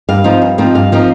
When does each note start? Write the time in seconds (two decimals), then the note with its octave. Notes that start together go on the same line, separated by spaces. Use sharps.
0.09 G2 F5
0.24 F3 C4 D#4
0.42 G2
0.58 F3 C4 D#4
0.75 G2 F5
0.92 F3 C4 D#4